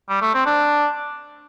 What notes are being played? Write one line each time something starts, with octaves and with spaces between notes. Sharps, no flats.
G3
A3
C4
D4